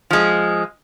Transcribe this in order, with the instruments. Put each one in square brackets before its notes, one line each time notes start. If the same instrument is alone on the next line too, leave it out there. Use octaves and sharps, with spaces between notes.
[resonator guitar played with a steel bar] F3 G#3